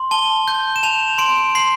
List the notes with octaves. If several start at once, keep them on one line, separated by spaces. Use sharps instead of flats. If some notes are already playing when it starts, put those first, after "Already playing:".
Already playing: C6
A5 G7
G6
E7
A5 F7
C6 D7
C6 C7